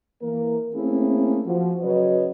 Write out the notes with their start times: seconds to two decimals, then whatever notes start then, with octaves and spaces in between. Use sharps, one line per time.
0.22 E3 A#3 A#4
0.74 A3 A#3 C4 C#4 E4 G#4
1.47 F3 F#4
1.82 C#3 F#3 B4 C#5 D#5